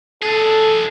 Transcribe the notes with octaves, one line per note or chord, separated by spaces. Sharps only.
D4 G#4 A4